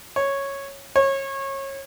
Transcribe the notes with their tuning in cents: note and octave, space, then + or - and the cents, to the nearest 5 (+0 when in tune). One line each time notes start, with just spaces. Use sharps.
C#5 -5
C#5 -25